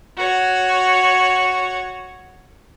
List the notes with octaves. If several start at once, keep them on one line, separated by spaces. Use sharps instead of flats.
F#4 C#5